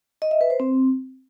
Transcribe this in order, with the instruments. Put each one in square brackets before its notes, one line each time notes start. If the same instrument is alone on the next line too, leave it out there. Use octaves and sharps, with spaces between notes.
[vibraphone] D#5
E5
B4
C5
C4